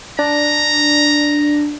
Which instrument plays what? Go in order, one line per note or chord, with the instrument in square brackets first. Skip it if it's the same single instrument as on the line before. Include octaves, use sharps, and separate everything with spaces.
[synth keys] D4 [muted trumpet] A#5